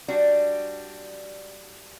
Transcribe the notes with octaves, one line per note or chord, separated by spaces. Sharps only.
G3 D4 F#4